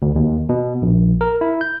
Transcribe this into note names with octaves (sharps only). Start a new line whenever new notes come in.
D2
D#2
B2
A#1
A#4
E4
G6